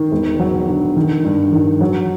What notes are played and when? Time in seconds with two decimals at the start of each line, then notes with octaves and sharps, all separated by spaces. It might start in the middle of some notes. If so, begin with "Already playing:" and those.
Already playing: D#3
0.12 E1
0.40 F#3
0.68 D3
0.96 D#3
1.24 G2
1.53 D#3
1.81 F#3